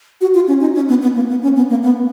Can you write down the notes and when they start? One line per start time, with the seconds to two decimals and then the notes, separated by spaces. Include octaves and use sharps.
0.21 F#4
0.34 F4
0.48 C#4
0.61 D#4
0.75 C#4
0.88 B3
1.02 B3
1.16 A#3
1.29 B3
1.43 C#4
1.56 B3
1.70 A#3
1.83 B3